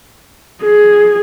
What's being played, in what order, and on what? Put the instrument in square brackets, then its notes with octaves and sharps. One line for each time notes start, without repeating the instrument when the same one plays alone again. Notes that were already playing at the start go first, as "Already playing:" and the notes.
[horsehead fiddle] G#4